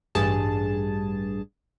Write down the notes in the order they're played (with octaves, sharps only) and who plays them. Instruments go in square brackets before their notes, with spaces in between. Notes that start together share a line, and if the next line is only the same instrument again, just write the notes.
[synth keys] A1 G2 G#4 A5